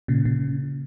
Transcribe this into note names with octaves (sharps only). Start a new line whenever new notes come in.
A#2 C#3
A#2 C#3